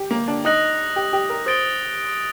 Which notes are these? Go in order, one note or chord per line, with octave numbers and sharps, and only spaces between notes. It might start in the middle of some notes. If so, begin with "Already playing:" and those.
Already playing: G4
A#3
D4
D#4 D#6 F#6 A#6 F#7
G4
G4
A#4
C5 D#6 A6 D7 G7